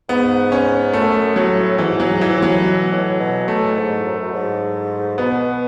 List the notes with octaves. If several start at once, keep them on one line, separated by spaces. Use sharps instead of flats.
G#2 B3
C#4
F#2 A3
A2 F#3
G#2 E3
F#3
G#2
E3
A2
F#3
B2
A2
B2
A2 A3
G#2
F#2
F#2
G#2
B2 B3